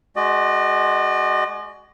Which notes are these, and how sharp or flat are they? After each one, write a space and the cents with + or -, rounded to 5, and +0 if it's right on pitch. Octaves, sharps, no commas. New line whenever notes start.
G#3 +25 F#4 +25 D#5 -45